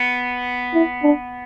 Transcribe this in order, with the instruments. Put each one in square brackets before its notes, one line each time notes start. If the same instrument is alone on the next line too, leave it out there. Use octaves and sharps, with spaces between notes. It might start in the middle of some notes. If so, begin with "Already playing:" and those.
Already playing: [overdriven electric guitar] B3
[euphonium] E4
D4